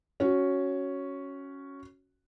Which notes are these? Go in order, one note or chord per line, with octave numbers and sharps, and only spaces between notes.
C#4 F#4